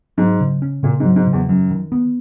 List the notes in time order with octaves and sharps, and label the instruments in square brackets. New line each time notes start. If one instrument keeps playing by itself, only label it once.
[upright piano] G#2 [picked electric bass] F#3
[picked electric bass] C#3
C#4
[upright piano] A#2 [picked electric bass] C#3
[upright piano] G#2
[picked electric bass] F#3
[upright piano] G#2
[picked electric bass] C#3
[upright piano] E2
[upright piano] F#2 [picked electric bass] F#3
[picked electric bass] D#3
B3